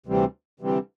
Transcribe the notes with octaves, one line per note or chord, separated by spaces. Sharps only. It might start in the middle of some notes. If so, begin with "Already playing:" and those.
D2 C3 E3 G3 C4
D2 C3 E3 G3 C4